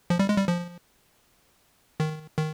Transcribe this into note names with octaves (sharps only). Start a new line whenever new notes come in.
F3
G3
G#3
G3
F3
D#3
D#3